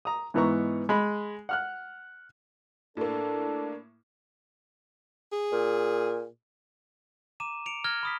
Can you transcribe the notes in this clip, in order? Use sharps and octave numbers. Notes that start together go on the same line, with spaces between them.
A#5 D#6
G#2 E3 B3 D#4 A#5 C#6
G#3 B5
F#5 F6 F#6
A2 A#3 D4 A4
G#4
A#2
A#5 D6 D#7 E7
C#7 D7 F7
A#5 F6 G#6 A#6 G7
B5 D#6 B6